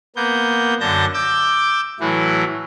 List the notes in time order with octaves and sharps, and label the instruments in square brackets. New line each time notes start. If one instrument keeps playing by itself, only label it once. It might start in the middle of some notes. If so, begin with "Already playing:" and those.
[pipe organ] A#3 B3 G6
F#2 D3 A5 G6 A#6
D6 E6 G6
A2 E3 F#3 E4